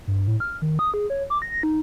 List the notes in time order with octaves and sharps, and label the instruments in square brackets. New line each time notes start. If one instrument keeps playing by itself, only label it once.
[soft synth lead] G2
A2
F6
D#3
D#6
G#4
C#5
D6
A#6
D#4